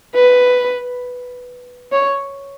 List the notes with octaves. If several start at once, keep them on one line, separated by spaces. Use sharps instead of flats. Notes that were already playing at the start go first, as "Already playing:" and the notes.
B4
C#5